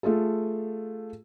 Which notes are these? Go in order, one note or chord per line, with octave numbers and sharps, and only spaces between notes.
A3 F4 G#4 A4